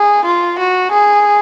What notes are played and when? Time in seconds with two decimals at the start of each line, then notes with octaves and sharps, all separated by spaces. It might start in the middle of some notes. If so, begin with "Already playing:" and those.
Already playing: G#4
0.24 F4
0.58 F#4
0.92 G#4